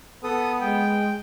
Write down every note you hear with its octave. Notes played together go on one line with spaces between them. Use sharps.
B3 A4 D#6
G#3 G5